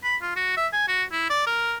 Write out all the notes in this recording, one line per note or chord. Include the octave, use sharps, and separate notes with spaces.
B5
F4
F#4
E5
G#5
F#4
E4
D5
A#4